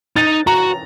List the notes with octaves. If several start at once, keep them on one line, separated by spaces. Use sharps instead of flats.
D#4 A6
F#4 A#5